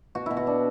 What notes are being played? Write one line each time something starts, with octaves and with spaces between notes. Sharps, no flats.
B2 F#4
B2 E4
F#4
D4